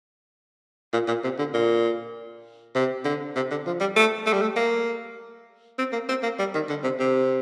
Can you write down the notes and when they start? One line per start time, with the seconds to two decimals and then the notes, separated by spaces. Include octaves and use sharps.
0.93 A#2
1.08 A#2
1.24 C3
1.38 D3
1.54 A#2
2.75 C3
3.05 D3
3.36 C3
3.51 D3
3.67 F3
3.80 G3
3.96 A3
4.27 A3
4.33 G3
4.42 A3
4.56 A#3
5.79 C4
5.93 A#3
6.09 C4
6.23 A#3
6.39 G3
6.55 D#3
6.69 D3
6.84 C3
7.00 C3